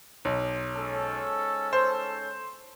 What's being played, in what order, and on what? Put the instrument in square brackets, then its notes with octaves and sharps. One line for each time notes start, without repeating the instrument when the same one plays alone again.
[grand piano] B1
[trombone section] G#2 C#4 A4
[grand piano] C5